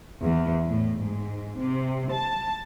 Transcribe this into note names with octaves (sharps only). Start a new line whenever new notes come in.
E2
A2
G#2
C3
A5